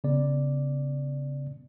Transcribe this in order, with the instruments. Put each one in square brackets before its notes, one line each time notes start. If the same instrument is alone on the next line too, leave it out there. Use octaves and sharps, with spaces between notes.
[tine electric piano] C#3 B3 D5